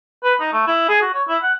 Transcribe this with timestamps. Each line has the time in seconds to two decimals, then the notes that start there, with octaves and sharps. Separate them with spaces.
0.24 B4
0.40 D#4
0.53 A3
0.67 E4
0.89 G#4
1.01 F#4
1.14 C#5
1.28 E4
1.43 F#5